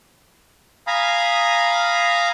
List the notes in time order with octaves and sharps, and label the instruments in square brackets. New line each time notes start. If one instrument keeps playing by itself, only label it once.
[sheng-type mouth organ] F5 G#5 A#5 B5 D#6